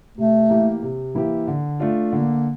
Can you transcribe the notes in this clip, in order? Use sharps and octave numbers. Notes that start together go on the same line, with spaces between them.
C3 A3
E3 A#3 E4 G4
C3
E3 A#3 E4 G4
D3
A3 D4 F4
D3 A#3